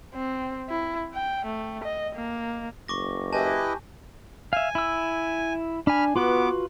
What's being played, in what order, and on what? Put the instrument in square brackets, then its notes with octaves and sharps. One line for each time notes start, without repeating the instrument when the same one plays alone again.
[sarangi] C4
E4
G5
A3
D#5
A#3
[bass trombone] F#1 [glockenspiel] C#6 D6 A#6
[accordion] E4 B4 D#5 [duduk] G4 [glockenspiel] G#5 A5
[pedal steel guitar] E5 F5 [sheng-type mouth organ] G#5
[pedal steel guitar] E4 E6
[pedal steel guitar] D4 G#5 [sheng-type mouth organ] B5 F6
[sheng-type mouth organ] B3 D6 [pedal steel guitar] F4 F#4 B4